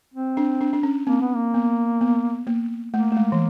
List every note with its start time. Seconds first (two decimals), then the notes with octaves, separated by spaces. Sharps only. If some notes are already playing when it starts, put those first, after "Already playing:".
0.14 C4
0.37 D4
0.61 D4
0.73 D4
0.83 C#4
1.07 A#3 C4
1.21 B3
1.35 A#3
1.54 B3
2.01 B3
2.47 A#3
2.93 A3 A#3
3.12 A3
3.17 G#3
3.32 E3